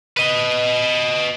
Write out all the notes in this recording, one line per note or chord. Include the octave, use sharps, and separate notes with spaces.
B4 D#5